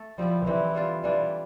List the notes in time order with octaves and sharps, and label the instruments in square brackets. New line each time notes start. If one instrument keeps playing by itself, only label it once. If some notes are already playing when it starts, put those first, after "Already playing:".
Already playing: [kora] A3 A4
[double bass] F3 [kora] G3 C4 E4 G4
[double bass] E3 [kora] G3 C4 E4 G4
[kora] G3 D4 F4
[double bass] E3 [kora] G3 D4 F4